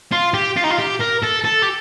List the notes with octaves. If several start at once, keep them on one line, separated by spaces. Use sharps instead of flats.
F4
G4
F4
D#4
F4
G4
A#4
A4
A4
G4